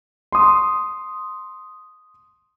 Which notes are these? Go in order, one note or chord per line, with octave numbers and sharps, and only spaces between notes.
C6 D#6